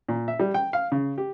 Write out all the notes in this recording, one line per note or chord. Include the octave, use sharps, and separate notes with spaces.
A#2
E5
G3
G5
F5
C#3
G4